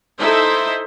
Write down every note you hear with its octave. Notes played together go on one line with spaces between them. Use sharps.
D#4 E4 A4 C5 E5